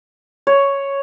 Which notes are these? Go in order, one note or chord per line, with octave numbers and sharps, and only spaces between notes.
C#5